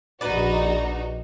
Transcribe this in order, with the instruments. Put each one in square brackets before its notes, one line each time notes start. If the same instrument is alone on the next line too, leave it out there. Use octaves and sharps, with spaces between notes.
[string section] A#1 D#4 F#4 [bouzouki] B4 D5